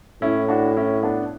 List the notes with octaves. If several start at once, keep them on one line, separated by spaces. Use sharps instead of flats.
A2 C#4 E4
D4 F#4
C#4 E4
B3 D4